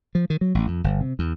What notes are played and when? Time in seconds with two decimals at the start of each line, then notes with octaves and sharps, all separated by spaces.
0.15 F3
0.30 D#3
0.41 F#3
0.55 A1
0.67 F2
0.84 G1
1.01 C3
1.19 E2